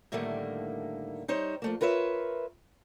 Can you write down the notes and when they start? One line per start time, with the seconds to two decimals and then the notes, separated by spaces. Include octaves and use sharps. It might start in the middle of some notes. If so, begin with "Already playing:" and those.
0.12 A2 D3 D#3 G3 A3 A#3
1.28 G3 D#4 C5 C#5
1.62 F3 A3 A#3
1.81 F4 A#4 B4 C#5 E5